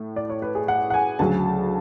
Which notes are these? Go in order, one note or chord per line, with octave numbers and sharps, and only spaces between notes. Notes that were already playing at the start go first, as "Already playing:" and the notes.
Already playing: A2 A3
D5
C#5
B4
G#4
F#5
F#5
G#5
D2 C#3 F#3 A5